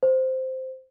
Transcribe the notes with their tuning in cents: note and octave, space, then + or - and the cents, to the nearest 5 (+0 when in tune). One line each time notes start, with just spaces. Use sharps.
C5 -5